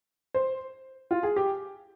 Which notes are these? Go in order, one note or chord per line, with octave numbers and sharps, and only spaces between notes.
C5
F4
G#4
G4